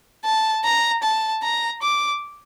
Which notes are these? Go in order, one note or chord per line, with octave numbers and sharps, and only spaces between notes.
A5
A#5
A5
A#5
D6